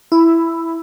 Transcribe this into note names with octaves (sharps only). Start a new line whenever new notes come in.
E4